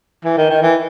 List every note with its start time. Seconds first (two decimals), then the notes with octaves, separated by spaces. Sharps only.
0.25 E3
0.37 D#3
0.50 D#3
0.62 E3